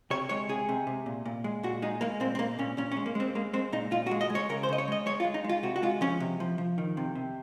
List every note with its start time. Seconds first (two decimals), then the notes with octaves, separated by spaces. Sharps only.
0.10 C3 C#5
0.29 G#3 C#5
0.49 C3 G#4
0.69 C3
0.87 C3
1.06 A#2
1.26 A#2
1.44 G#3
1.63 A#2 F#4
1.82 G#3 D#4
2.01 G#3 A#3
2.20 A#2 C4
2.35 C4
2.39 A#2 A#3
2.59 A#2 C#4
2.77 A#2 C#4
2.92 C#4
2.97 G#3
3.06 A#3
3.15 G#3 C4
3.35 G#3 A#3
3.53 G#3 C4
3.72 A#2 D#4
3.91 A#2 F4
4.07 F#4
4.11 G#3
4.21 D#5
4.30 G#3
4.35 C#5
4.49 C#3 A#4
4.63 C5
4.69 C#3 D#5
4.78 C#5
4.88 G#3 D#5
5.06 G#3 C#5
5.20 F4
5.25 G#3
5.34 D#4
5.44 G#3
5.49 F4
5.63 C3 F#4
5.76 F#4
5.82 G#3 F4
6.01 F3 C#4
6.20 C3
6.40 F3
6.58 F3
6.78 D#3
6.97 C3
7.15 C3